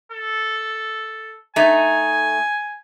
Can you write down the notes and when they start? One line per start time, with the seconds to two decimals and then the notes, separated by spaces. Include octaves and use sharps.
0.11 A4
1.56 A3 D#4 G#5